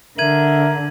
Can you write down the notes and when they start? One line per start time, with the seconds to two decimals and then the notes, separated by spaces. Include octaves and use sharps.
0.18 D3 A#4 E5 G#6 D#7 F#7